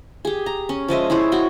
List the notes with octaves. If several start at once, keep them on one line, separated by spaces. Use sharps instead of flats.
G4 G#4
A#5
C#4
F3 G#3 D#5 E5
E4 G#4 C5 C#5
F#4 G5